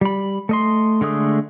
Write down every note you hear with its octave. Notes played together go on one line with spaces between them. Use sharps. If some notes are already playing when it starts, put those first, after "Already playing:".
G3 B5
A3 D#5 C6
D3 G#3 A3 D#6